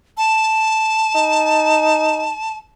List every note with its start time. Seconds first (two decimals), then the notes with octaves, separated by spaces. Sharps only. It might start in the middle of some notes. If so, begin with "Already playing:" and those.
0.17 A5
1.15 D#4